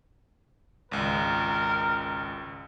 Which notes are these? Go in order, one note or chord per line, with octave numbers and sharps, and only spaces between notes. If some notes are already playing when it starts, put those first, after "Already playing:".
G#1 C#2 A#4